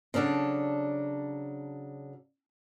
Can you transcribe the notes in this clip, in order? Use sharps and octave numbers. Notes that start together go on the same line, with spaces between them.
C#3 F#3 D4 A4